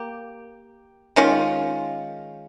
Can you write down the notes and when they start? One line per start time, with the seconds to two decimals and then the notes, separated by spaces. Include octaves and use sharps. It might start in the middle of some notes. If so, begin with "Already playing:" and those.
Already playing: A#3 G4
1.16 D#3 G#3 C#4 F4